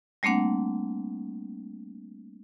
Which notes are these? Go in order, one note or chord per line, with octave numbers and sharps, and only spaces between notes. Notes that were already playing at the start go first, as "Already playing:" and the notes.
G3 A3 A#3 C4 D4 F#5